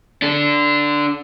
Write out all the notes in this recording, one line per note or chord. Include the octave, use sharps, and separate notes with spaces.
D4 A4